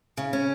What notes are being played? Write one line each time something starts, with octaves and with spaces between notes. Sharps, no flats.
C#3
C#4